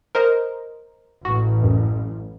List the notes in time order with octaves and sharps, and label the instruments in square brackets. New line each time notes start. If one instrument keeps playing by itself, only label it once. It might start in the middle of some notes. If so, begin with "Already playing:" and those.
[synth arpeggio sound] A#4 C5 D#5
[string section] A1 [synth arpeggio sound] F#4
[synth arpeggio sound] F#2